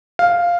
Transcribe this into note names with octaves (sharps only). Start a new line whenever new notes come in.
F5